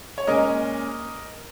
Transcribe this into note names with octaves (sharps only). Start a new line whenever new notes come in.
C#5
A#2 G#3 C#4 A#4 D#5